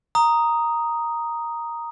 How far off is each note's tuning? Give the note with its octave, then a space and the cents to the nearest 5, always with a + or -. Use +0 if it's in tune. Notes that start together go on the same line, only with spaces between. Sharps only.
A#5 +0 D#6 +0